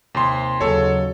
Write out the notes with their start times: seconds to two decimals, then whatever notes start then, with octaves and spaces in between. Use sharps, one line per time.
0.15 D#2 C3 C6
0.61 D#2 C#3 F#3 A4 C#5